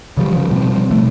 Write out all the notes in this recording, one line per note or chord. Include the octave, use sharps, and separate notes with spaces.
C#3 F3 G3
C#3 F3
B2 F3 G3 C4
B2 A3